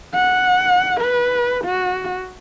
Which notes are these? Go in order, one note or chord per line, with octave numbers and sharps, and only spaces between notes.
F#5
B4
F#4